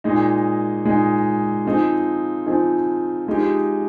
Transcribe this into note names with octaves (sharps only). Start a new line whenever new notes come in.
A#2 G#3 D#4
A#2 G#3 D#4
F3 C4 D#4 G#4
F3 C4 D#4 G#4
F3 G#3 D#4 G4